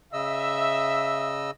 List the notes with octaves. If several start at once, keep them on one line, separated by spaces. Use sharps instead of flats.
C#3 D#5 E5 E6